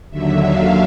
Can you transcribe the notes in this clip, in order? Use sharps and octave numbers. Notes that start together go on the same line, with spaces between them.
D#2 D3 F#3 E5
F5